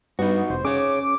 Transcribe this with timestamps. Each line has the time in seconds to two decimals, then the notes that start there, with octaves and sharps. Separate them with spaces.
0.19 G2 B3 D#4 F#4
0.50 F1 C5
0.65 C#4 G#4 C#5 D6